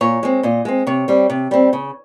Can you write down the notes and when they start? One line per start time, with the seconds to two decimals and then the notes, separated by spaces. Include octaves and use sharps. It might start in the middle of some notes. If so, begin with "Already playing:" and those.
0.01 A#2 C#5
0.23 G#3 C4
0.43 A#2 D#5
0.65 G#3 C4
0.87 C3 C#5
1.08 G3 C4
1.30 C3
1.51 G3 C4
1.73 C#3